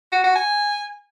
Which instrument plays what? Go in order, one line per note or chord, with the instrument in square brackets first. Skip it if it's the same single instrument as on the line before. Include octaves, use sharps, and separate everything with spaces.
[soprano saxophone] F#4
F#4
G#5